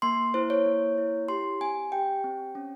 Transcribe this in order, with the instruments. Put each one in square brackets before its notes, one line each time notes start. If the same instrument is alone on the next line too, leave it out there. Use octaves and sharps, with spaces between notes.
[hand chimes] A#3 C6
E4 C5
C#5
A#3
E4
G4 C6
C4 G#5
G4 G5
C4
C#4